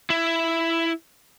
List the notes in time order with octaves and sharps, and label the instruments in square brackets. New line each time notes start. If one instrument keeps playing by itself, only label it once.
[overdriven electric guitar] E4